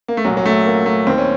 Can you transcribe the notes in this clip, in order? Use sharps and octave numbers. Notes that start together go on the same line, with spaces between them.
A#3
A3
C2 A#2 F#3
F#3
A3
A#3
A3
D#2 D#3 C4
C#4